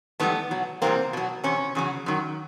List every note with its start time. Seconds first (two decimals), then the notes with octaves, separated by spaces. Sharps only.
0.20 G#2 E3 G3 A3 B3
0.51 B2 F#3
0.82 E2 C3 E3 G3 A#3 C4
1.13 B2 F#3
1.44 E2 C3 C#4
1.75 E2 C#3 F#3
2.06 F#2 D#3 F#3